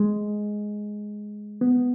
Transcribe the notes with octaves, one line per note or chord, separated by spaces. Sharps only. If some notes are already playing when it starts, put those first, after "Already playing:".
Already playing: G#3
B3